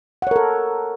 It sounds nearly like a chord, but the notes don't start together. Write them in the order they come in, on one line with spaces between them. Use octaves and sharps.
F#5 C#5 A#4 A4